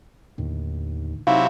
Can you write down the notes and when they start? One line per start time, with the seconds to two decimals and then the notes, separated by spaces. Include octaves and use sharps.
0.38 D#2 A2 D3 D#3
1.27 C3 F#3 D#4 E4 F5